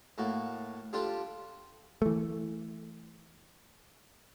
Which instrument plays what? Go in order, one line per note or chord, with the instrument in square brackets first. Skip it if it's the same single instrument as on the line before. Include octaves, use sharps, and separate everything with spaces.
[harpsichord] A2 A#3 F#4
G3 D4 F4 G4 A4
[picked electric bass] E3 A3